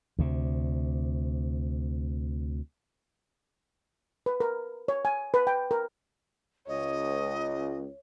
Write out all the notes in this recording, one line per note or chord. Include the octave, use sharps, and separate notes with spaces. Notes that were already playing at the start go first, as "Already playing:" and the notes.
D2 C3
B4
A#4
C#5
G#5
B4
G5
A#4
C#2 C#5 D#5